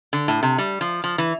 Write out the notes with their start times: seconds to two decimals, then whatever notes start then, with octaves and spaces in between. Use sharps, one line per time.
0.13 D3
0.28 A2
0.43 C3
0.58 G3
0.81 F3
1.04 F3
1.18 E3